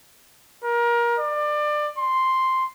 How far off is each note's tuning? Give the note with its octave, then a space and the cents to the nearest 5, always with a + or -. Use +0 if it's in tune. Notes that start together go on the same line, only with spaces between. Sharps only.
A#4 +25
D5 +25
C6 +0